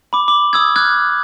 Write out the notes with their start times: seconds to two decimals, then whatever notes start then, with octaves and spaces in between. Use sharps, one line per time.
0.13 B5 D6
0.28 D6 F#7
0.53 D#6 E6 G#6
0.76 D6 F6 F#6 G#6